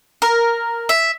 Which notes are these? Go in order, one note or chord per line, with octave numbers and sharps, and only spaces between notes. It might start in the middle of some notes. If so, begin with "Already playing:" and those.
A#4
E5